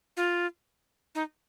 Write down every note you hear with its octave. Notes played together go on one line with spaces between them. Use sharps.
F4
D#4